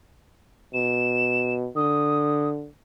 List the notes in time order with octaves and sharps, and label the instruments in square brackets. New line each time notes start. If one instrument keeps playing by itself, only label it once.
[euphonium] B2 [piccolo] E7
[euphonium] D3 [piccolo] D#6